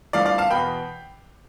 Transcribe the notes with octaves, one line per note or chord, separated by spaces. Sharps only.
G1 G2 F3 A3 E4 D5 F5
D5 F5
F5 A5
E2 B2 B3 G5 B5